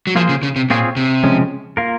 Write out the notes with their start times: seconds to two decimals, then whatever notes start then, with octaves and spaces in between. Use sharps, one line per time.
0.07 F#3
0.16 F3 A#3 F4 G#4 C5
0.29 C#3
0.43 C#3
0.56 C3
0.70 A#2 C4 F4 G#4 C#5
0.96 C3
1.24 C#3 F3 G#3 C#4
1.77 A#3 F4 A#4